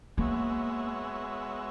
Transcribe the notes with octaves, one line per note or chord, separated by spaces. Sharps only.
G#3 A#3 B3 F#4 C#5 E5